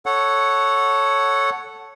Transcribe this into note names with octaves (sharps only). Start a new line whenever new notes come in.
A4 C#5 F#5